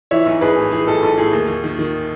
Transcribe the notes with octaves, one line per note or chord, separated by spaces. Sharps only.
E3 C#5 E5
B1
B1 G#4 B4
A2
E3 G#4
B1 A4
B1 A4
A2 G#4
D#2
D#2
D#3
D#3